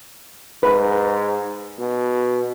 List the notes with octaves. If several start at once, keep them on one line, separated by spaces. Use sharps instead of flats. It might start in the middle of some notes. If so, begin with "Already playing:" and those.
G#2 B4
B2